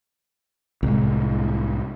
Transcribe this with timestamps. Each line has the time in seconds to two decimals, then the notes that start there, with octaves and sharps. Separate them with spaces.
0.83 C2 A2 G#3